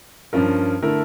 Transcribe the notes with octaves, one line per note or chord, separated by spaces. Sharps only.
G2 F3 C#4 F4 A#4
D3 A3 E4 A#4